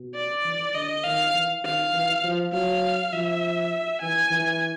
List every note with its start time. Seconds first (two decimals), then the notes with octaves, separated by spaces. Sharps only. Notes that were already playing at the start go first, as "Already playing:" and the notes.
Already playing: B2
0.15 D5
0.44 E3
0.75 D3 D#5
1.04 D#3 F5
1.34 E3
1.64 D#3 F5
1.93 E3
2.24 F3
2.52 F#3 F5
3.13 F3 E5
4.01 E3 G#5
4.31 E3